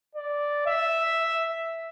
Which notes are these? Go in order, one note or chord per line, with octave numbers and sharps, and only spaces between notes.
D5
E5